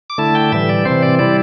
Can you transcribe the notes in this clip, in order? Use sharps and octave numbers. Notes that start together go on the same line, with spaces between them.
D6
D3 A3 E4 A5
G5
A2 E3 G3 E5
D5
C3 E3 C4 C5
D5
G3 E4 D5